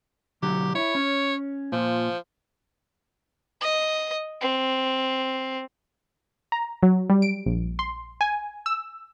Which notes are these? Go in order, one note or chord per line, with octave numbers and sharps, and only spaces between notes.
B1 D3 F#3 G4
E4 C#5
C#4
A#2 F3
D#5
C4
A#5
F#3
G3
D7
A#1
C6
G#5
E6